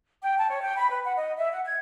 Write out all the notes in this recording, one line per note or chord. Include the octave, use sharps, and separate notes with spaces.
G5
A5
C#5
G5
B5
B4
F#5
D#5
E5
F#5
G#6